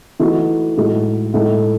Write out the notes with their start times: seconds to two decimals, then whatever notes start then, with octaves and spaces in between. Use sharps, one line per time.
0.20 E3 A3 D#4 F#4
0.77 A2 G#3 D#4 F#4 A4
1.34 A2 G#3 D#4 A4